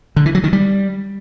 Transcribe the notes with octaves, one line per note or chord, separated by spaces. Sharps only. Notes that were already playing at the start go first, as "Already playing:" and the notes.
D3
E3
F#3
D#3
G3